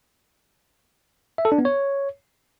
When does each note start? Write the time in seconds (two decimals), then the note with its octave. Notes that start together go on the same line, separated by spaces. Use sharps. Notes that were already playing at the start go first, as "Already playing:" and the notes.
1.38 E5
1.45 A4
1.52 D4
1.58 B3
1.65 C#5